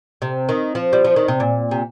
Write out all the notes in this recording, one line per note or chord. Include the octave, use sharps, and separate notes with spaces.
C3
D#3
F3
G3
F3
D#3
C3
A#2
C3